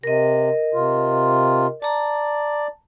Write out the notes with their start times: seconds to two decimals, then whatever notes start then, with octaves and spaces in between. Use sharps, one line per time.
0.03 C3 A#4 D#5
0.74 C3 F4
1.82 D5 A5 A#5